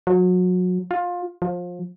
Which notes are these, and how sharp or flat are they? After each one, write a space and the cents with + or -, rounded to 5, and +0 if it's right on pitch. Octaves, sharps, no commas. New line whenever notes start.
F#3 -30
F4 +20
F3 +25